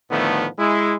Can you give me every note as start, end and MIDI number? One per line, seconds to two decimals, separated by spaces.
0.10 0.47 45
0.10 0.47 50
0.10 0.47 51
0.10 0.47 53
0.10 0.47 57
0.10 0.47 59
0.58 0.94 56
0.58 0.94 64